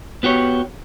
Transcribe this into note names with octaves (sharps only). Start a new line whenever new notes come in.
B3 F#4 G4 C#5